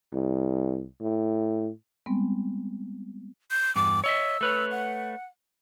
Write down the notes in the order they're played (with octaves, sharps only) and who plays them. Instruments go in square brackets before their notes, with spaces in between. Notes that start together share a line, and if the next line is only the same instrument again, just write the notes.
[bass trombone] C2
A2
[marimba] G3 G#3 B3 C4
[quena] G6
[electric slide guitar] E2 G2 [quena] D6
[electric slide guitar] C#5 D#5 E5 [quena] E6
[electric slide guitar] A3 B4 C#5
[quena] F#5